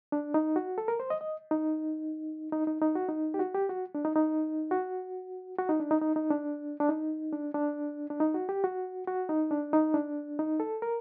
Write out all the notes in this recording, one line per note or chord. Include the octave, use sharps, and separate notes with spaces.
D4
D#4
F#4
A4
A#4
C5
D#5
D#5
D#4
D#4
D#4
D#4
F#4
D#4
G4
F#4
G4
F#4
D4
D#4
D#4
F#4
F#4
D#4
D4
D#4
D#4
D#4
D4
D4
D#4
D4
D4
D4
D#4
F#4
G4
F#4
F#4
D#4
D4
D#4
D4
D#4
A4
A#4